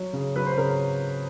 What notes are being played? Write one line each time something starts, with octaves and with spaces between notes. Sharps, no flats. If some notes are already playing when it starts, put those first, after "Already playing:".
Already playing: F#3
C#3
F#3 B4
C5
B4
C#3 A#4